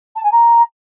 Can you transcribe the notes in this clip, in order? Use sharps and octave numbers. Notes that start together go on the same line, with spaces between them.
A5
G#5
A#5